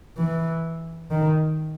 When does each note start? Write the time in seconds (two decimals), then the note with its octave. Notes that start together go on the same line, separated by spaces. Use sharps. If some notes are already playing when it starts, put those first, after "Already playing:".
0.17 E3
1.10 D#3